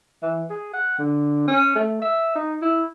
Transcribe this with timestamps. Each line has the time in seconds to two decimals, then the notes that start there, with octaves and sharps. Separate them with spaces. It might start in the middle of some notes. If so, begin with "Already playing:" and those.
0.22 E3
0.50 G#4
0.73 F#5
0.98 D3
1.48 C#4
1.75 A3
2.02 E5
2.35 D#4
2.62 E4